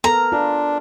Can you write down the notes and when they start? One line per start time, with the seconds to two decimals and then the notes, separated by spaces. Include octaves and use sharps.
0.04 B3 A4 A#4 A#5
0.32 D4 F4